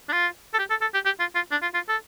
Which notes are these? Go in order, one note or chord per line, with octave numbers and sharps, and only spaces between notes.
D4
F4
A4
G4
A4
A4
G4
G4
F4
F4
D4
F4
F4
A4